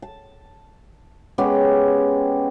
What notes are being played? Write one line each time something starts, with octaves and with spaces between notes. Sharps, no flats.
A5
G#3 B3 C#4 G4